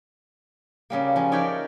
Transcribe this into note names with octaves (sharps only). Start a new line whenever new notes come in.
C#3 G3 A#3
F3 C#4
D#4 A#4 C#5 D5 E5 G5